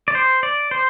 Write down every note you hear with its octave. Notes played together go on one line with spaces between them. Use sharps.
D5
C5
D5
C5